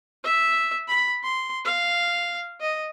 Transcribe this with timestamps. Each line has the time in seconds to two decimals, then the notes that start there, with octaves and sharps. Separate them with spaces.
0.24 E5
0.88 B5
1.23 C6
1.65 F5
2.61 D#5